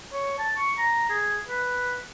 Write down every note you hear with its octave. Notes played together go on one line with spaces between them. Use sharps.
C#5
A5
C#6
A#5
G#4
B4